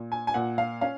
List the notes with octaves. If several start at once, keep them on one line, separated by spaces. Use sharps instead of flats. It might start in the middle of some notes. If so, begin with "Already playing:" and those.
Already playing: A#2
G#5
G#5
A#2 F#5
F5
C#4 F5